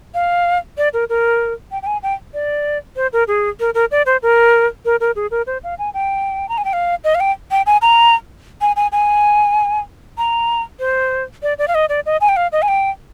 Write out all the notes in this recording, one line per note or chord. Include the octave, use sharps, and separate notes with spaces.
F5
D5
A#4
A#4
G5
G5
G#5
G5
D5
C5
A#4
G#4
A#4
A#4
D5
C5
A#4
A#4
A#4
G#4
A#4
C5
F5
G#5
G5
A#5
G#5
G5
F5
D#5
F5
G5
G5
G#5
A#5
G#5
G#5
G#5
A#5
C5
D5
D5
F5
D#5
D5
D#5
G#5
G5
F5
D#5
G#5
G5